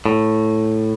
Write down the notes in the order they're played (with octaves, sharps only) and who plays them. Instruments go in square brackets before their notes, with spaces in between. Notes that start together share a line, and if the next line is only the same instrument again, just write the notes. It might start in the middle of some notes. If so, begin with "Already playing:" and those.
[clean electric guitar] A2